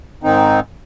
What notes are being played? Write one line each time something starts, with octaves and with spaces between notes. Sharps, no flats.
G#2 D#3 C4 D#4